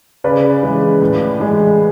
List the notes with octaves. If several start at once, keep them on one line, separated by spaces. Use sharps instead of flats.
C#3 B4 D5
E3 G#3
A2
E3 G#3